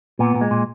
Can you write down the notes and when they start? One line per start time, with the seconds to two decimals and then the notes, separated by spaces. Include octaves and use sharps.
0.19 A#2 B3
0.35 A#2
0.41 G#3
0.51 A#2